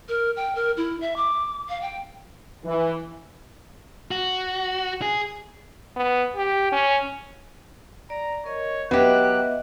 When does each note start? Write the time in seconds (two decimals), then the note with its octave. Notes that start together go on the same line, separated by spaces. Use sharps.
0.09 A#4
0.37 G5
0.55 A#4
0.77 E4
1.01 E5
1.17 D6
1.69 F5
1.82 G5
2.65 E3
4.11 F#4
5.02 G#4
5.97 B3
6.36 G4
6.73 C#4
8.10 D5 A#5
8.46 A#4 C#5 D#5
8.91 F#3 B3 G4 B4 D#5 E5 F#6